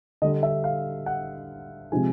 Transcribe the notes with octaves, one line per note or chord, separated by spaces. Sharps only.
D3 G3 D#5
E5
F5
F#5
C3 F3 G#3 G#5